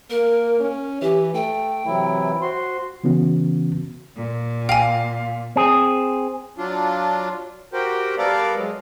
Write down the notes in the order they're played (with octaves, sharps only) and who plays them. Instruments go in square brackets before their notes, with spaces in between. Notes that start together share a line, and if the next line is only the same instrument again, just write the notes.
[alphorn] A#3 [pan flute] A#4
[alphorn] C#4
[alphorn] E3 [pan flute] G4
[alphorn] A3 [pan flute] G5
[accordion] C3 F#3 E4 [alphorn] E3
[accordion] F#4 C6 [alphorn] C5
[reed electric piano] C#3 E3 B3 C#4 F#4
[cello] A#2
[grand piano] F5 [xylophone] G5 G#5
[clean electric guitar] C4 G#4
[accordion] F#3 D4 F4
F#4 G4 A#4 C5 G5
G3 B3 A4 A#4 D5 F5
F#3 G#3